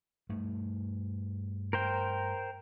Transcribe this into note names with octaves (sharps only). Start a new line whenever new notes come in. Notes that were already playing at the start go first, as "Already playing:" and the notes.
G2 A3
A#4 C5 G5